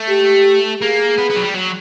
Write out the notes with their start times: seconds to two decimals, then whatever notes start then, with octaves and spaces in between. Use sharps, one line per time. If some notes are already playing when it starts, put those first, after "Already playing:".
Already playing: A3
0.09 G4
0.81 A#3 G#4
1.18 B3
1.30 B3
1.36 F#3
1.42 G3
1.54 F#3